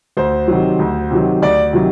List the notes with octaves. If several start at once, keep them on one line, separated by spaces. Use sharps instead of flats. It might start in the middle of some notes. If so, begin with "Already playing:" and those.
D2 C5
C3 D#3 F#3
D2
C3 D#3 F#3
D2 D5
C3 D#3 F#3